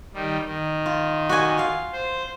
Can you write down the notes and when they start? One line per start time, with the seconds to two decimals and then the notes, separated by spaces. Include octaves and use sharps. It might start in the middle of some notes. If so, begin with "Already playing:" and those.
0.14 D#3 G3
0.46 D#3
0.86 F4
1.29 F#4 D5 G#5
1.58 F4 F5
1.93 C5